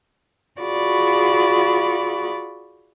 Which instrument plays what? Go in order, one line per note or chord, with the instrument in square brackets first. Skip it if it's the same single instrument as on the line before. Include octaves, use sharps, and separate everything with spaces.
[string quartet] F4 F#4 G#4 D5 B5